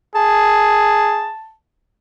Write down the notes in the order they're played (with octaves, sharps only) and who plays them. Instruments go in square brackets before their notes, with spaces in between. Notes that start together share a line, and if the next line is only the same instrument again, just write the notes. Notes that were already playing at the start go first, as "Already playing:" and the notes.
[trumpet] G#4 [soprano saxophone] A5